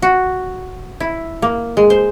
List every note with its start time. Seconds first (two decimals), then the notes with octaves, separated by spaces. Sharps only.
0.02 F#4
1.00 E4
1.42 A#3
1.77 G#3
1.90 C5